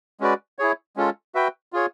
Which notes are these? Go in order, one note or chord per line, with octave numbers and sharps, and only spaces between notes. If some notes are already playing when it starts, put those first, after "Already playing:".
G#3 C#4 F#4 B4 D5
E4 G#4 C#5
G#3 C#4 F4 A4
F#4 B4 E5 G5
F4 G#4 C#5